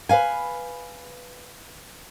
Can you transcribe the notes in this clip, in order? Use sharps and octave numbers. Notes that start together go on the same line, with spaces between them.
B4 D5 F5 G#5